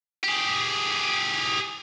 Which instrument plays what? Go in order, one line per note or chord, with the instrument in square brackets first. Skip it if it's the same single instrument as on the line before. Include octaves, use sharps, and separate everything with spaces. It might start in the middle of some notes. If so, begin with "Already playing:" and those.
[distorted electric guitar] G4 G#4